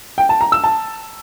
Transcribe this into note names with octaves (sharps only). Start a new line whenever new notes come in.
G5
A5
A#5
E6
A5